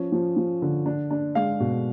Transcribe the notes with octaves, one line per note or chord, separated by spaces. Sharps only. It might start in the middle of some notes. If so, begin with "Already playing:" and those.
Already playing: F3 C#4
F3
F3
D3
D4
D4
G#3 F5
B2